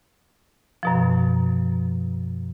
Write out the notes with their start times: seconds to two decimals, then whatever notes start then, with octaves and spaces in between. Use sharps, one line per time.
0.83 F#2 B2 F3